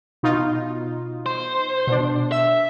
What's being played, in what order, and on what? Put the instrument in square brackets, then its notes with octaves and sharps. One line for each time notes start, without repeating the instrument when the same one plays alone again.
[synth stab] B2 D#4 F4
[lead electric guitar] C5
[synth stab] B2 D4
[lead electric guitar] E5 [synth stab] E6